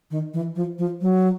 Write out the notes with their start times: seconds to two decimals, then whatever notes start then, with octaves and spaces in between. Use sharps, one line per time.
0.11 D#3
0.34 E3
0.56 F3
0.79 F3
1.01 F#3